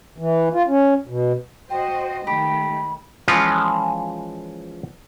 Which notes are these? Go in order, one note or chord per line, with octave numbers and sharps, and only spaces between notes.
E3
F4
C#4
B2
F#4 C5 D#5 G5
D#3 A3 G4 B5
E3 F3 G#3 C#4 F4